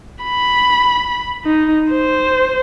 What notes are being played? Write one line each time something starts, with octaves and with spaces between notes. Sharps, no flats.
B5
D#4
C5